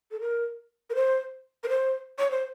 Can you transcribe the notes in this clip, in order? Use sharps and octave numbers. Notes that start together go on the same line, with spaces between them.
A4
A#4
A#4
C5
A#4
C5
C#5
C5